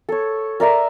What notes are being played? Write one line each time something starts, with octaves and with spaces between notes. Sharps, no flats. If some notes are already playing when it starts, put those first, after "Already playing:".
A4 C#5
A#4 D5 E5 A#5